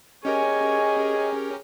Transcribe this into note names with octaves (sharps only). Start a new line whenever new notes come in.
C#4 G4 G#4 A#4 C#5 D#5 G#5